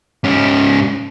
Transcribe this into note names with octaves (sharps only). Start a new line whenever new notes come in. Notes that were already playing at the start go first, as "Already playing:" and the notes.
G#2 C#4